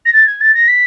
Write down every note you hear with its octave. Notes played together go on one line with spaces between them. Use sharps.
A#6
A6
G#6
A6
A#6
B6